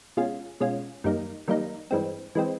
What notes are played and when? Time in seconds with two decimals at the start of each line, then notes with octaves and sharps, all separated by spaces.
0.17 B2 G#3 C#4 F4
0.60 B2 G#3 C#4 F4
1.04 F#2 D#3 G3 A#3 D#4
1.48 F#2 D#3 G3 A#3 D#4
1.91 G2 E3 G#3 C4
2.35 E3 G#3 C4